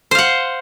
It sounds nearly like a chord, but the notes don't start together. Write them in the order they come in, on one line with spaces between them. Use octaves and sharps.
C5 F5 F#5